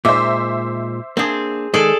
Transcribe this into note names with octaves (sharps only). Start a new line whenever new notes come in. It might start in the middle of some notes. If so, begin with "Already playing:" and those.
A#2 G#3 D#4 C5 E5 D6
A#3 C4 D4 G#4
D#3 G#3 G#4 A4 D5